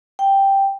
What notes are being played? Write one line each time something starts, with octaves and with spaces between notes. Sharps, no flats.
G5